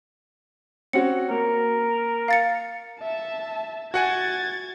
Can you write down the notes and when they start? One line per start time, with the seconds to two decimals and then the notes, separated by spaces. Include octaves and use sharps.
0.93 C4 C#4 F#4 C#7
1.30 A#3 A#4
2.28 F5 A6 C#7
3.02 E5 A5
3.94 F#4 F#5 G#5 G#6 A6